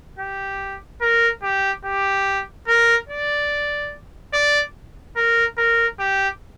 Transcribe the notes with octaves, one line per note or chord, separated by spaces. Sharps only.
G4
A#4
G4
G4
A#4
D5
D5
A#4
A#4
G4